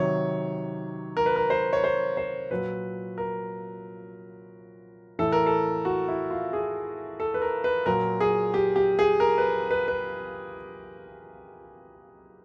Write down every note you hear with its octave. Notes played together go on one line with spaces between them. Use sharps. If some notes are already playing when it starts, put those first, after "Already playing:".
Already playing: C3 D#3 F#3 C#5
A#4
B4
A#4
C5
C#5
C5
C5
A#2 F#3 B4
A#4
A2 E3 A4
A#4
A4
F#4
E4
F4
G#4
A4
B4
A#4
B4
A#2 F#3 A#4
G#4
G4
G4
G#4
A#4
B4
B4
B4